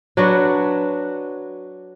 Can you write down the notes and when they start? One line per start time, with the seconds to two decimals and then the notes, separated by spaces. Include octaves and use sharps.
0.17 F#3 D4 F#4 B4